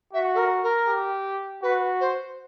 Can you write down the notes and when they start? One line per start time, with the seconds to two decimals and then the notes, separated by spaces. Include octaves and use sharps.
0.13 F#4 E5
0.34 A4
0.37 A#4
0.63 A#4
0.88 G4
1.63 F#4 B4
2.00 C5